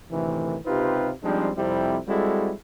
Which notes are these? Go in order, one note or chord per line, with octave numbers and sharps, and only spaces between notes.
D2 A2 C3 D#3 E3
C#2 C3 D#4 F4 G4 B4
F3 G3 G#3 C4 D4 D#4
F2 C3 G3 C4 E4 G4
G3 G#3 C4 E4 F#4 A4